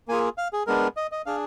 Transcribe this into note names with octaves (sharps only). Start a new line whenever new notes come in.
A#3 F4 G#4 G#5
F5
G#4
G#3 B3 D4 A#4
D#5
D#5
D4 G#4 F5